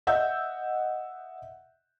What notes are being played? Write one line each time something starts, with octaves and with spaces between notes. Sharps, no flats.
D#5 E5 F#5 E6 G6